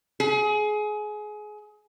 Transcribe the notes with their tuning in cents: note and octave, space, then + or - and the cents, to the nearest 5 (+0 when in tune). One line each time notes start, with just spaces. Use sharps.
G#4 +25